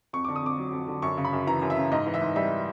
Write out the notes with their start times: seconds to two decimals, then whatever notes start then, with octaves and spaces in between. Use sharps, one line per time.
0.13 F2 C#6
0.25 D3 D6
0.36 D#6
0.43 F2 D6
0.58 F#3
0.73 F2
0.88 D3
1.02 F#2 C#6
1.17 C#3
1.25 B5
1.33 F#2
1.47 E3 A#5
1.62 F#2
1.70 E5
1.77 C#3
1.91 G#2 D#5
2.07 E3
2.14 E5
2.22 G#2
2.36 G3 E5